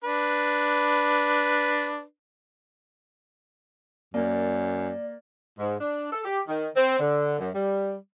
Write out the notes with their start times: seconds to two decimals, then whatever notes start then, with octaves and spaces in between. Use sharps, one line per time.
0.04 D4 B4
4.14 F#2 A#3 D5
5.59 G#2
5.81 D4
6.12 A4
6.25 G4
6.48 D#3
6.76 C4
6.99 D3
7.39 F#2
7.54 G3